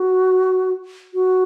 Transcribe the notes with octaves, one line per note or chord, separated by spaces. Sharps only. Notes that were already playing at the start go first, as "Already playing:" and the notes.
Already playing: F#4
F#4